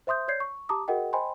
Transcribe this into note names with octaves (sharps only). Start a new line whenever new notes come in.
C5 E5 C6 D#6 G6
C#5 D5 G6 G#6 C7
C#6
G4 A5 A#5 D6 D#6
F#4 G#4 A#4 D#5 F#5 G5
C5 D#5 G5 G#5 B5 C6